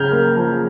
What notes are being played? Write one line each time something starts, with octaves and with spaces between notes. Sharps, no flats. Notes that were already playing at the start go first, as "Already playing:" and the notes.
Already playing: C#3 C#4 F6 G6 G#6
A#3
F3